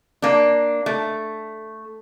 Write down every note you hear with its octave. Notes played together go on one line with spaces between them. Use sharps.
A#3 D4
A3